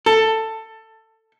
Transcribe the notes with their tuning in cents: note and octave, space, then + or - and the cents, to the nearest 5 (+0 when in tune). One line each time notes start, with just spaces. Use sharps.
A4 +15